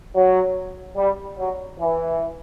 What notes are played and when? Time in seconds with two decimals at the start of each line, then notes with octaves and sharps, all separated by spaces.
0.15 F#3
0.96 G3
1.37 F#3
1.78 E3